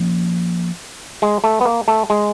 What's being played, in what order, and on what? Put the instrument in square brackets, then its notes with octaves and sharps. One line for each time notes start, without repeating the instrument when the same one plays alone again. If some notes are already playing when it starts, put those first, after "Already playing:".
Already playing: [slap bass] F3 A#3 C#4
[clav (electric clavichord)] G#3
A3
B3
A#3
A3
G#3